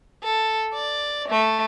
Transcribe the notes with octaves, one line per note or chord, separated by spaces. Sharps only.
A4
D5
A3